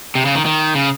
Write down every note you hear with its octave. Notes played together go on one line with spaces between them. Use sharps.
C3
C#3
D#3
D#3
C#3